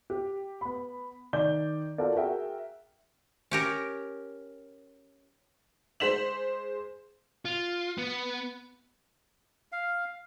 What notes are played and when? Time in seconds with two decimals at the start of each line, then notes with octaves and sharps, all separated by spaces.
0.10 G4
0.61 B3 B5
1.33 D#3 D5 G6 G7
1.98 F4 F#4 A4 A#4 D5
2.16 F#4 G#4 A#4 E5 F#5 G5
3.51 C#4 G4 A#4
6.00 G#3 C5 B6 E7 F#7
7.45 F4
7.98 B3
9.72 F5